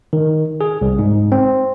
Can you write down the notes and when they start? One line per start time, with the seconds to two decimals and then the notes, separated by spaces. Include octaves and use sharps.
0.13 D#3
0.61 G#4
0.81 C2
0.99 G#2
1.32 C4